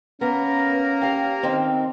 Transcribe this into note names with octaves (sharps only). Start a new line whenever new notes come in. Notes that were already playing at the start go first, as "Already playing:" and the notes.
A#3 B3 C#4 A#4 A#5
G4 F5
D#3 C4